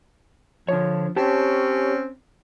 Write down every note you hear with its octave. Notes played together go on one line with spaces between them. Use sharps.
D3 F3 C#5
C4 C#4 G4 A5